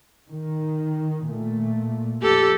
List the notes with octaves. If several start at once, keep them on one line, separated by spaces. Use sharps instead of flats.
D#3
A#2 A3
F2 G4 A4